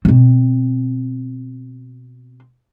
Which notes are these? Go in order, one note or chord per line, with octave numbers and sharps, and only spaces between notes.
B2 C4